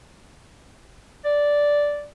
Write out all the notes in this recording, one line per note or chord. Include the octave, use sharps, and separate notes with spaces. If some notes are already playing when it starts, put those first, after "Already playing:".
D5